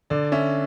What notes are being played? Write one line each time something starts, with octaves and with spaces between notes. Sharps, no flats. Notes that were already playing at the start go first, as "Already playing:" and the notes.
D3 D5
C#4 E5